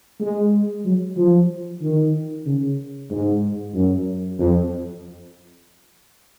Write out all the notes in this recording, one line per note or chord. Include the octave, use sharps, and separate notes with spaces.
G#3
F#3
F3
D#3
C#3
G#2
F#2
F2